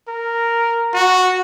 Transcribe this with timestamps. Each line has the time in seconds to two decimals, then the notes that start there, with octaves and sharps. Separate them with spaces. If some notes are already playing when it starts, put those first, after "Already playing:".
0.08 A#4
0.93 F#4